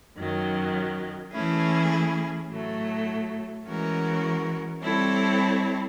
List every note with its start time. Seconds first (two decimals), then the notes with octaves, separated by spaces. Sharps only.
0.17 F#2 D#3 F#3
1.33 E3 A3 C#4 E4 G#4
2.50 A2 F#3 A3
3.67 E3 G#3 C#4 F#4 A#4
4.83 G3 C4 E4 A4 C#5